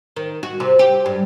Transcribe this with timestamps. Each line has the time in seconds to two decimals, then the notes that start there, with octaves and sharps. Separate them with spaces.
0.16 D#3
0.43 F#4
0.60 C3
0.79 G4
1.06 G2